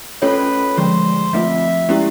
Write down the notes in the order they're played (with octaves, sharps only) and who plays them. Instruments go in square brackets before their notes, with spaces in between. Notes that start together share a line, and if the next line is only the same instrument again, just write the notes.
[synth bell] A3 C#4 F4 A4 C#5 [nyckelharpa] B4
[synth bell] D3 F3 G#3 [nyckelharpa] C5
[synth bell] F3 A3 C4 F4 [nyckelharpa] E5
[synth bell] G#3 C#4 E4 G4